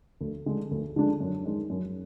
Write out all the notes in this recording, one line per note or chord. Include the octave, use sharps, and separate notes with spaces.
D2
D3 G#3 D4
D2
D3 G#3 D4
F#2
D#3 G#3
F#2